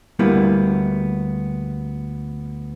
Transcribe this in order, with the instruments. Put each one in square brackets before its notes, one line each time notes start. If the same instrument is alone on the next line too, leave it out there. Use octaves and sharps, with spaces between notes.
[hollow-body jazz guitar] D2 G3 A#3 B3 E4